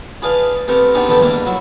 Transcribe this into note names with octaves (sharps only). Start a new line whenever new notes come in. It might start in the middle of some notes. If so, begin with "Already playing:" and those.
E4 G#4 B4 D5 F5 A5
A3 B3 C4 G4 A#4
B3 C4 D4 D#4 G4 G#4
E2 B3 D4 E4 A4 G5
G3 G#3 A#3 D4 E4
F#3 E4 F#4